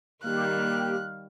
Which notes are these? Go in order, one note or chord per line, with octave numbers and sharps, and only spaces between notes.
D#3 G3 A#3 G4 F5 F#6